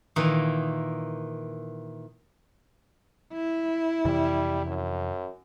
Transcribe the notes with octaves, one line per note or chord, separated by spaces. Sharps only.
A#2 D#3 E3
E4
F2 C3 E3 G3
F#2